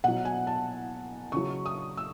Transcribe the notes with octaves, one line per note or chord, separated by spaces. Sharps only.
B2 F#3 F#5
G#5
A5
C#3 F#3 C#6
D#6
E6